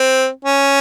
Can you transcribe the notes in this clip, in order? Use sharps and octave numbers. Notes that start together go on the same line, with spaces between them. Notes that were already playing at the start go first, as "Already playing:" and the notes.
Already playing: C4
C#4